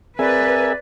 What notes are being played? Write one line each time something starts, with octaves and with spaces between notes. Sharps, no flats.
C4 G#4 A#4 B4 D5 E5 G#5